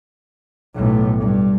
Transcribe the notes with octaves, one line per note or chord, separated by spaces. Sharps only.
B1 A2
G2